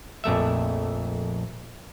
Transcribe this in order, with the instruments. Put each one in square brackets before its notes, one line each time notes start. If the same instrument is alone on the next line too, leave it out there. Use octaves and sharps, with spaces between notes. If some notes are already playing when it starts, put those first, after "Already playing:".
[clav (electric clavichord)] A#1 F2 A3 E5